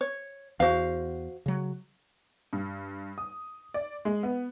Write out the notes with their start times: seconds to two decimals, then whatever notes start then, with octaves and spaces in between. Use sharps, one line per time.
0.01 C#5
0.60 E2 F#4 C5 F5
1.46 C#3 F#3
2.53 G2
3.18 D#6
3.74 D5
4.05 G#3
4.23 B3